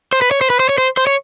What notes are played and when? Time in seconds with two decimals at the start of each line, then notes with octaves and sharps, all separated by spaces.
0.13 C5
0.22 B4
0.31 C#5
0.41 C5
0.50 B4
0.60 C5
0.69 C#5
0.78 C5
0.97 C5
1.07 C#5